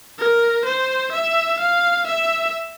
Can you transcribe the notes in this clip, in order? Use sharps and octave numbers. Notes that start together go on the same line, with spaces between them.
A#4
C5
E5
F5
E5